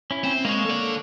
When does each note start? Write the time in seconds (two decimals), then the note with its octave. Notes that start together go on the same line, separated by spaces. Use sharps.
0.11 C#4 E4
0.24 C4
0.45 G#3 A#3 C#5
0.65 A4 D5